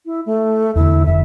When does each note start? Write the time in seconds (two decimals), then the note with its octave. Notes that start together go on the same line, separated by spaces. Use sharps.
0.06 E4
0.26 A3
0.76 E2 D3 E4
1.06 E1 F2 D3 E5